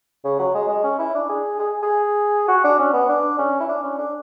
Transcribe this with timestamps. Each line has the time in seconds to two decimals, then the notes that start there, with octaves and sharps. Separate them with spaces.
0.24 C#3
0.39 F#3
0.54 G#3
0.69 G#3
0.84 C#4
0.99 E4
1.14 D4
1.29 G#4
1.59 G#4
1.82 G#4
2.48 F#4
2.64 D4
2.79 C#4
2.93 B3
3.09 D4
3.38 C#4
3.60 E4
3.68 D4
3.83 C#4
3.98 D4